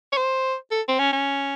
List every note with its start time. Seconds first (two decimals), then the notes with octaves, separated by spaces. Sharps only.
0.12 C#5
0.17 C5
0.71 A4
0.88 C4
0.99 C#4
1.13 C#4